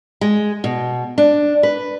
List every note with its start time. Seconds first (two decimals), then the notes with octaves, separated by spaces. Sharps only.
0.21 G#3
0.64 B2
1.18 D4
1.63 B4